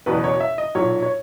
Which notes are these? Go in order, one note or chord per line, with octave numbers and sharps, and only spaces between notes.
F#1 E2 B2 F#3 B4
C#5
E5
D#5
B1 A#2 F#3 C#5
C#5